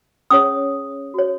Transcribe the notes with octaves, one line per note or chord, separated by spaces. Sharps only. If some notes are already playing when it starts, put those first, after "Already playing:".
C#4 G#4 C#5 D#6
F#4 C#5